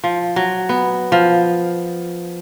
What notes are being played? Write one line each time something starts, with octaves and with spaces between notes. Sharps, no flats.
F3
F#3
B3
F3